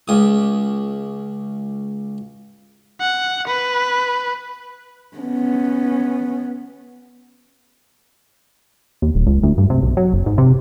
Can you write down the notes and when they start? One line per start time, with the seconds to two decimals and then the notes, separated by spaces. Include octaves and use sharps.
0.08 C#2 D#6
3.01 F#5
3.47 B4
5.18 B3 C#4
9.02 D#2
9.15 D#1
9.27 C#2
9.43 D2
9.58 G2
9.70 C3
9.82 B1
9.97 F#3
10.13 F#1
10.26 G#2
10.38 C3